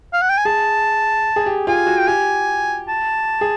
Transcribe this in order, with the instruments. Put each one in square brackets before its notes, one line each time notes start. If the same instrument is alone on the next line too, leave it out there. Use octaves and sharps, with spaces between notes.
[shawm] F5
F#5
G5
G#5
[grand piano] G#4 [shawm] A5
[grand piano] G#4
G4
[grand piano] F4 [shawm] G#5
[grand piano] F#4
[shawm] G5
[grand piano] G4 [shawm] G#5
[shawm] A5
[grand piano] G#4